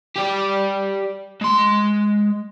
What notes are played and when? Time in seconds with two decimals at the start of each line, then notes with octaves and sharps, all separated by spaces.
0.16 G4 D5
1.41 G#3 C6